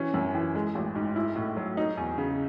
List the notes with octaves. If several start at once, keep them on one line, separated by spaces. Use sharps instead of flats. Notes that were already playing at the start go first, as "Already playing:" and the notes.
Already playing: E3 C#4
F#2
E3
G#3
A1
G#2
E4
A2
F#3
D#4
E2
C#3